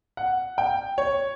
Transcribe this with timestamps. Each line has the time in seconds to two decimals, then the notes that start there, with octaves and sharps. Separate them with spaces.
0.17 F#5
0.58 G5
0.98 C#5